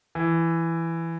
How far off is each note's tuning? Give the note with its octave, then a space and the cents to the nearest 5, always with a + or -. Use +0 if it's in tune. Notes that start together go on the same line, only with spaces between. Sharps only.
E3 +10